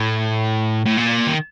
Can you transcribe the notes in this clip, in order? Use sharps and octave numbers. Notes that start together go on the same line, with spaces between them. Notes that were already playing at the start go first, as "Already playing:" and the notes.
Already playing: A2
A2
A#2
D#3